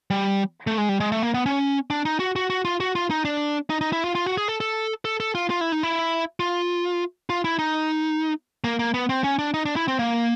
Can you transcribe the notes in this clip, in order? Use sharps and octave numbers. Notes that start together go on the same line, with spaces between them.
G3
A3
G#3
G3
G#3
A3
A#3
B3
C#4
D4
D#4
F#4
F#4
F#4
F4
F#4
F4
D#4
D4
D#4
D#4
E4
F4
F4
F#4
G#4
A4
A4
A4
A4
F4
F4
E4
D#4
E4
F4
F4
E4
D#4
A#3
A#3
B3
C4
C#4
D4
D#4
D4
E4
C4
A#3